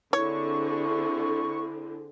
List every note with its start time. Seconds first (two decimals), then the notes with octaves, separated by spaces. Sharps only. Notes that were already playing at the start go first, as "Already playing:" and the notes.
0.13 D3 C4 E4 G#4 C#5 C#6